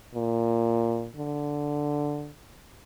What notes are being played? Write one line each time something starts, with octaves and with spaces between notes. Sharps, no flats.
A#2
D3